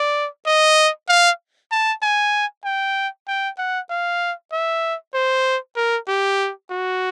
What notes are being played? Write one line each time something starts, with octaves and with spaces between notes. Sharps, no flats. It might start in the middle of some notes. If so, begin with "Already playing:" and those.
Already playing: D5
D#5
F5
A5
G#5
G5
G5
F#5
F5
E5
C5
A#4
G4
F#4